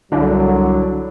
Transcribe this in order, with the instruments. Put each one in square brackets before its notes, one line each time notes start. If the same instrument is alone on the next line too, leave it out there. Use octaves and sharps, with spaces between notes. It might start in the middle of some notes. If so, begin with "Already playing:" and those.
[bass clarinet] C2 [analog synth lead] D3 [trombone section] F#3 [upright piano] D4 E4